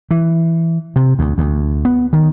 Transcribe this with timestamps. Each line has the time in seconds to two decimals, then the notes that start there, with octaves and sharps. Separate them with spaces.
0.11 E3
0.96 C3
1.19 D2
1.38 D2
1.85 B3
2.13 D#3